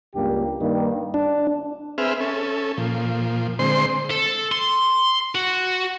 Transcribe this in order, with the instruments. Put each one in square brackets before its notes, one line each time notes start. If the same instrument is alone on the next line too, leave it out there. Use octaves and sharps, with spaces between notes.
[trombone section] C#2 G2 A#3 G4
G2 D#3 G3 A#3
[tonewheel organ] D4
[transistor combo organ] C4 G#4 B4 E5 F6
C#4 A4
A#2 F3
D3 G#3 C4 C5 C6
[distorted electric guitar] A4
C6
F#4